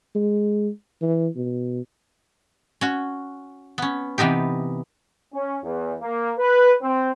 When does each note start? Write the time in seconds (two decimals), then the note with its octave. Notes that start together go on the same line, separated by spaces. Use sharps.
0.15 G#3
1.01 E3
1.36 B2
2.81 C#4 F#4
3.78 B3 C#4
4.18 C3 E3 B3 D#4 G4
5.34 C#4
5.64 E2
6.00 A#3
6.38 B4
6.81 C4